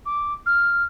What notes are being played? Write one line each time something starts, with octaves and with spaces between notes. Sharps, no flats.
D6
F6